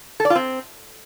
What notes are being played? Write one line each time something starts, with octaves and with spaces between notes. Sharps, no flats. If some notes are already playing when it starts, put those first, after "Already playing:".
A4
D5
F4
C4